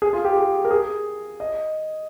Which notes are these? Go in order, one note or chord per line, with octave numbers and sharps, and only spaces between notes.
G#4
F4
G4
G#4
A#4
G#4
D#5